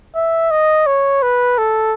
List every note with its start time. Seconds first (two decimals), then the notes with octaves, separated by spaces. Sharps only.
0.15 E5
0.51 D#5
0.86 C#5
1.22 B4
1.58 A4